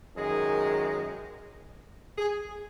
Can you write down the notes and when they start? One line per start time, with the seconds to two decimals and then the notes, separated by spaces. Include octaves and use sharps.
0.16 F#2 D#3 G#3 G#4
2.18 G#4